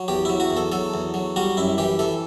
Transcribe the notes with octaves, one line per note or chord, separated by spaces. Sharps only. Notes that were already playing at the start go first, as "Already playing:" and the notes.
Already playing: F#3
E2 G4
F#3 E4
F#4
E2
A4
F#3 A4
E2
F#3
G3 F#4
F#2 E4
E3 G4
E3 A4